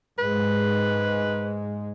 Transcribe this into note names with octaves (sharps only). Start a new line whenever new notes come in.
G#2 G#3 B4